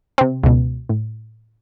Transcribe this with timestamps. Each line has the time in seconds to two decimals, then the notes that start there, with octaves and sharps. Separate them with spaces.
0.18 C3 C4
0.43 C#2 B2
0.89 A2